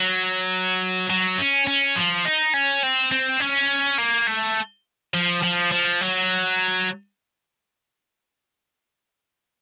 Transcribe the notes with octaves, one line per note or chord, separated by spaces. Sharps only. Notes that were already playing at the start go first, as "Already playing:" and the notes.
Already playing: F#3
F#3
C#4
C#4
F3
D#4
C#4
C4
C4
C#4
A#3
A3
F3
F3
F3
F#3